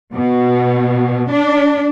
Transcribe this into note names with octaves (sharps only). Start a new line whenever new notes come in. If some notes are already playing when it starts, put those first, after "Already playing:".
B2
D4